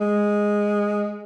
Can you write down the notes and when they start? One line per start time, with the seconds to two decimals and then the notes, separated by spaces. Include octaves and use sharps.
0.01 G#3